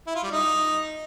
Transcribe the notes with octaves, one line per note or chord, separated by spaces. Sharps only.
E4
F4
G3
D#4